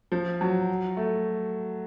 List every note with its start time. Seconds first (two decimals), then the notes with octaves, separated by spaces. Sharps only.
0.12 F3
0.41 F#3
0.97 A3